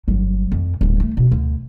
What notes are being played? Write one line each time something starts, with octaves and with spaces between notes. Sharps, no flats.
G1 F#3
F2
D1 G1
A3
B2
D2